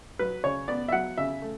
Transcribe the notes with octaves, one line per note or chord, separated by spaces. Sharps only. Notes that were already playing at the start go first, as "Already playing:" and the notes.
F#3 B4
C#3 C#5
B3 D5
E5
F#3 F#5
C#3 E5
A3